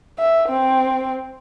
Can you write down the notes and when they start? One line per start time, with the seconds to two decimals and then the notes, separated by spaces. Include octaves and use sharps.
0.19 E5
0.49 C4